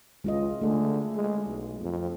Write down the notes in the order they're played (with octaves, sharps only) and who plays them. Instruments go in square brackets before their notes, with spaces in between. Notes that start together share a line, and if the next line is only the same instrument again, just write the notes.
[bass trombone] C#2 [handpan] G#3 F4 D#5
[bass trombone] D3 [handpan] A3 G#4
[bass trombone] G#3
B1
F2